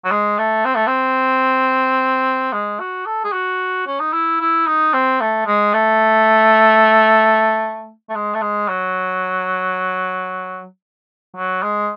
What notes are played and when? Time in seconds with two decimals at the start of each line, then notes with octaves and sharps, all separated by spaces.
0.05 F#3
0.11 G#3
0.39 A3
0.65 C4
0.75 A3
0.87 C4
2.53 G#3
2.79 F#4
3.06 A4
3.24 G#4
3.33 F#4
3.87 C#4
4.00 D#4
4.13 E4
4.40 E4
4.67 D#4
4.94 C4
5.21 A3
5.47 G#3
5.74 A3
8.09 A3
8.15 G#3
8.35 A3
8.42 G#3
8.68 F#3
11.36 F#3
11.63 G#3